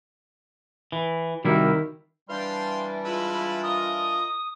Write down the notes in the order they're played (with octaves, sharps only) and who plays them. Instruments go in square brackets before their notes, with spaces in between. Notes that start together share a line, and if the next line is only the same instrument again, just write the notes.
[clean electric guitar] E3
[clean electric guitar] C2 G3 E4 [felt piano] D#3 E5 [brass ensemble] F#4 A#4
[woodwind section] E3 G3 D4 [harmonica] F5 G5 C6
[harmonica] G#3 E4 B4 [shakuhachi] F4
[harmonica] A#4 D#5 [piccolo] D#6